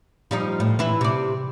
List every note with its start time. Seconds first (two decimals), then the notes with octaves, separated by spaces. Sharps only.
0.31 F3 G3 D#4
0.60 A2
0.79 E3 E4
1.01 C3 D5